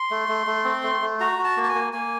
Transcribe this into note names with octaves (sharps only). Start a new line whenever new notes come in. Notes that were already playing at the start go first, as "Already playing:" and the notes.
Already playing: C6
A3
A3
A3
C4
A3
A3
F#4 A#5
F#4
A5
A#3
A5
G#5
A#3
A#3 G#5